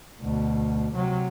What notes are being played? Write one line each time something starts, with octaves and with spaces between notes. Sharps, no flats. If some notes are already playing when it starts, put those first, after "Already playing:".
D2 B2
C3 F#3